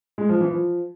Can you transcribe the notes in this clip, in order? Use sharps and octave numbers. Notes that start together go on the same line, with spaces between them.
G#3
F3
E3
F3